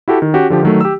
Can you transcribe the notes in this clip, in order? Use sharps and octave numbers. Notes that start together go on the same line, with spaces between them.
E4 F#4 G4 A4
D#3
C#4 F#4 G4
D3 F3 G4
D#3 F#3 A3
G4 E6